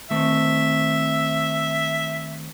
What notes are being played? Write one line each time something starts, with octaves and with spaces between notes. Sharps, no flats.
D#3 A3 C4 E5